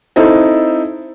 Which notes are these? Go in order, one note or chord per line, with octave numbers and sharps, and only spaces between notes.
C4 D#4 E4 A4